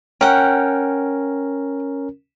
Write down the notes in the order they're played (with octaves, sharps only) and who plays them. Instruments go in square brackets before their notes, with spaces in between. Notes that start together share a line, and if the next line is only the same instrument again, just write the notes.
[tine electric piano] C#4 A#4 [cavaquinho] F#5 G5